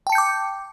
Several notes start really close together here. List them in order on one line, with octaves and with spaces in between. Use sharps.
G5 A5 C#7 G6 D6